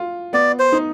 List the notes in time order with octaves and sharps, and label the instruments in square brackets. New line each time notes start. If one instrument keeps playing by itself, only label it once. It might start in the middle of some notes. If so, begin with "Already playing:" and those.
Already playing: [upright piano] F4
[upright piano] B3 [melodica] D5
[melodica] C5
[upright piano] D#4